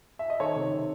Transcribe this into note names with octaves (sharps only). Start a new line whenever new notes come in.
E5
D#5
D#3 A4 C#5
C3
C3